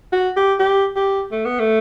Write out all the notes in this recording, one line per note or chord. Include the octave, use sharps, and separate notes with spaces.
F#4
G4
G4
G4
A3
B3
A3